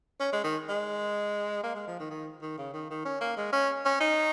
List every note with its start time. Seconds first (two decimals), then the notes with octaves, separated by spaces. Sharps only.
0.20 C#4
0.33 G#3
0.44 D#3
0.69 G#3
1.63 A#3
1.75 G#3
1.88 F3
1.99 D#3
2.10 D#3
2.42 D#3
2.58 C#3
2.74 D#3
2.90 D#3
3.05 C#4
3.21 A#3
3.37 G#3
3.53 C#4
3.85 C#4
4.00 D#4